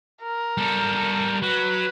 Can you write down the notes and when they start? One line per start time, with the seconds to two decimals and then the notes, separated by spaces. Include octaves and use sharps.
0.23 A#4
0.57 G3 A4
1.42 F#3 B4